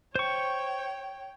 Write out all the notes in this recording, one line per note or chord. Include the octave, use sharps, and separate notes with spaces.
C5 C#5 G5 C#6